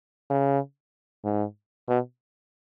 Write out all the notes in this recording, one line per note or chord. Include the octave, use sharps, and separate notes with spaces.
C#3
G#2
B2